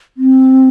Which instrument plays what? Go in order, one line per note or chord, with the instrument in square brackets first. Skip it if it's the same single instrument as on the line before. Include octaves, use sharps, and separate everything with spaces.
[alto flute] C4